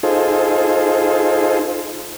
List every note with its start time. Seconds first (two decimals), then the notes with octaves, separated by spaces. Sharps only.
0.03 D#4 F4 G#4 A4 C5